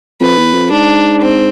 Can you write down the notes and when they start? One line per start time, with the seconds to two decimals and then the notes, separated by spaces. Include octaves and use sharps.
0.20 F2 B4
0.38 E2
0.54 F2
0.71 G#2 D4
1.21 C4